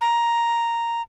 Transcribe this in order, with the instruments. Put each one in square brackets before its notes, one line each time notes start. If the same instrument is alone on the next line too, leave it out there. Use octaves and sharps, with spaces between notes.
[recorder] A#5